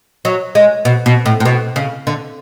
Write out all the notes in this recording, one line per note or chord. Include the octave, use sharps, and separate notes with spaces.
F#3
G#3
B2
B2
A2
A2
B2
C#3
D3